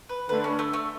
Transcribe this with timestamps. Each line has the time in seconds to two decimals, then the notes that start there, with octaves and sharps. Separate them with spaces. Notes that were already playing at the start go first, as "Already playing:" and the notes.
0.09 B4
0.29 D3 A3 D4 B4
0.44 C#4
0.59 A3
0.73 A3